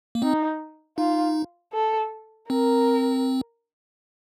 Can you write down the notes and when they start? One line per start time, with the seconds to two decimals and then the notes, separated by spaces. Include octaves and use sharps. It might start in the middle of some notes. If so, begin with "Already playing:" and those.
0.15 A#3
0.22 C4 D#4
0.98 D#4 F4
1.73 A4
2.49 C4 A#4